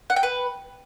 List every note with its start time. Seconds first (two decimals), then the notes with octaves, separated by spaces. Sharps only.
0.10 F#5
0.16 G5
0.23 B4